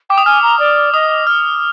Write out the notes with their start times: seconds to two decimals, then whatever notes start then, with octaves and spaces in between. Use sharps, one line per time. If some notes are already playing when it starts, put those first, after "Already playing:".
0.10 G5 D6
0.18 D#6
0.26 G#5 F6
0.43 A#5
0.59 D5
0.93 D#5 D#6
1.27 F6